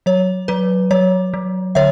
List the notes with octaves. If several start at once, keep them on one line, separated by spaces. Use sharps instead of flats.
F#3 C#5
F#3 B4
F#3 C#5
F#3
D3 C#5 E5